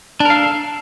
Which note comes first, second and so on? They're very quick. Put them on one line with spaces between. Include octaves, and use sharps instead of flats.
D4 A#4 F5 A4